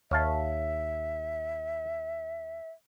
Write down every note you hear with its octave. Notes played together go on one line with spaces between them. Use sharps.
D#2 C#5 E5 F5 A5